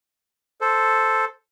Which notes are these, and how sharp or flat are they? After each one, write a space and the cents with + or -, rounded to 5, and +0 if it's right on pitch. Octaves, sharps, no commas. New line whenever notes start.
A4 +0 C5 +0